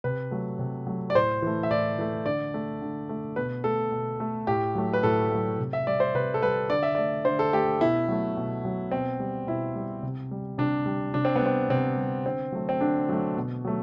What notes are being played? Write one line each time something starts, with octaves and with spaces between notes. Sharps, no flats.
C3 B4
F#3 A3
C3
F#3 A3
D5
A2 C5
E3 A3
E5
A2 D5
E3 A3
D3 D5
A3
D3
A3
B2 B4
A3 A4
B2
A3
A2 G4
F#3 A3
B4
A2 A4
F#3 A3
C3
E5
G3 D5
C5
C3 B4
A4
G3 B4
D3 D5
E5
A3 D5
D3 C5
A4
A3 G4
B2 E4
F#3 A3
B2
F#3 A3
B2 C4
G3
B2 E4
G3
C3
G3
C3 D4
G3
C3 D4
C4
B3
G3 C4
C3 C4
G3
D3 C4
F#3 A3
C4
D3 D4
F#3 A3
B2
F#3 A3